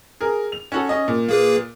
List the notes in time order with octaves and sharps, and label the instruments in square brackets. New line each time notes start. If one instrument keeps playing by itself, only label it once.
[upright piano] G#4 A#4
F7
C#4 F#4 A4
C#4 D#5
A#2
[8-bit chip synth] A#3 G#4 B4